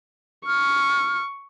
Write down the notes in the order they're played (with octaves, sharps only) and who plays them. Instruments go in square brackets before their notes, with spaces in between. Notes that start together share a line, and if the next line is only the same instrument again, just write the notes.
[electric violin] C#6 [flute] F6